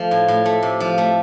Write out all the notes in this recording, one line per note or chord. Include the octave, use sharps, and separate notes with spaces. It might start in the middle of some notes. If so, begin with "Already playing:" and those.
Already playing: F3 A3
A2
A2
A3
C3
F3
A3